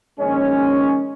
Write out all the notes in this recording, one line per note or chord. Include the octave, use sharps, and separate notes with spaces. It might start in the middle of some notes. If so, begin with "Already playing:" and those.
A#1 D#3 G#3 C#4